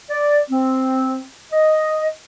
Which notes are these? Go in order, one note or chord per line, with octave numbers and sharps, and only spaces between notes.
D5
C4
D#5